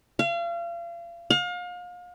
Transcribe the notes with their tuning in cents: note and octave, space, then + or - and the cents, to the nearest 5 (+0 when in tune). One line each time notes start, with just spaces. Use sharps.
F5 -35
F5 +35